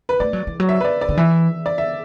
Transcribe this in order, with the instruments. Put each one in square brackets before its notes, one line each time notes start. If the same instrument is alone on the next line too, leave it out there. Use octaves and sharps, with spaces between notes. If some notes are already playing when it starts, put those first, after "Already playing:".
[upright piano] B4
[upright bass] A3 [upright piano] D5
[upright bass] F#3
E3
F#3
[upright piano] E5
B4
D5
D5
[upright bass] D3
[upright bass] E3 [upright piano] E5
[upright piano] D5
E5